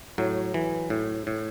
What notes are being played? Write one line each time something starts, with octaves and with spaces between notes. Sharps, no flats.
A2 F#3
E3
A2
A2